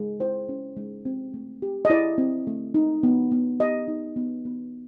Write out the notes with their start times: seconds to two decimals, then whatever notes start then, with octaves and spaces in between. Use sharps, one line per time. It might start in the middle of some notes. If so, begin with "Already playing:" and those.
Already playing: G#3
0.20 E4 C5
0.49 C#4
0.77 G#3
1.05 C4
1.34 A3
1.62 G4
1.85 D#5
1.90 E4 D5
2.18 C4
2.47 A3
2.74 D#4
3.03 B3
3.31 B3
3.60 G4 D#5
3.88 D#4
4.16 B3
4.45 B3